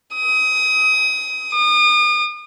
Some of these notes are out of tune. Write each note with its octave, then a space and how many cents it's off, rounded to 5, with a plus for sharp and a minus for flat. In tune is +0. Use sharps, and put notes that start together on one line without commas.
D#6 +25
D#6 -40